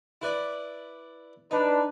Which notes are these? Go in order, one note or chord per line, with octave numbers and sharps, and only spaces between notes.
E4 B4 D5
D4 D#4 B4